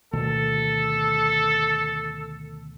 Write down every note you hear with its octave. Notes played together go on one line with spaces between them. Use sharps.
D2 B2 D#3 A4